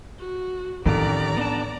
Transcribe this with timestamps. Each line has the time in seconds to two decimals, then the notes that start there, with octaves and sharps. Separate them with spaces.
0.19 F#4
0.86 A1 F2 D#3 C#4 G4 D5 A#5
1.37 B3 D4 A5